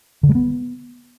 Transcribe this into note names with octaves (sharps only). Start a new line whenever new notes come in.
D3
G#3
B3